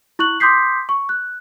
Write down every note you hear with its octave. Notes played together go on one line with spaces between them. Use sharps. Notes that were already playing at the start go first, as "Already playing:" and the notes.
E4 C#6 F#6 F#7
C6 D6 D#6 G6 B6 C7
C#6
F#6